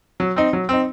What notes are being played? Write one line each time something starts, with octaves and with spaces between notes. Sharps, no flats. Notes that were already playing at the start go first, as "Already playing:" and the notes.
F#3
C4 D#4
F#3
C4 D#4